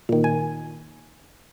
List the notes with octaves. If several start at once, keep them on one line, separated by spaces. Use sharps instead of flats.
A#2 D#3
G#5